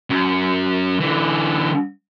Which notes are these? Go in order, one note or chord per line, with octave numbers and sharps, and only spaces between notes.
F#2
D3 E3